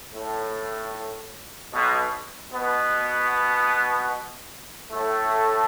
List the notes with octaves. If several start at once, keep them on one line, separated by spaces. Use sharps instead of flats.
A2
B1 B2
B2 B3
A2 A3